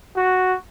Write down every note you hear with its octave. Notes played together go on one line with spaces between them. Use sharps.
F#4